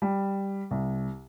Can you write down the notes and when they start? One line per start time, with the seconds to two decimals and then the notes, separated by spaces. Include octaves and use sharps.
0.02 G3
0.71 C2